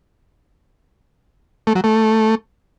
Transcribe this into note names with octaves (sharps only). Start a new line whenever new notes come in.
A3
F#3
A3